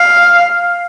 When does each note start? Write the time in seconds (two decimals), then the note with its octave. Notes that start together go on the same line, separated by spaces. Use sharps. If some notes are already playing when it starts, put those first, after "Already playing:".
Already playing: F5